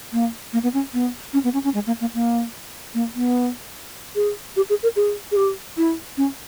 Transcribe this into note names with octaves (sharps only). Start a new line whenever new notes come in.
A#3
A#3
B3
C#4
B3
C#4
B3
C#4
C#4
G#3
A#3
A#3
A#3
A#3
B3
G#4
G4
G#4
A#4
G#4
G#4
G4
E4
C#4